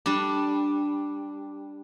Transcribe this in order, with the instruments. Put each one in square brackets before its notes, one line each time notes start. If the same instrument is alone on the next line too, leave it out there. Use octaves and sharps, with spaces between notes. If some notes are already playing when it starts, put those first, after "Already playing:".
[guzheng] G3 D4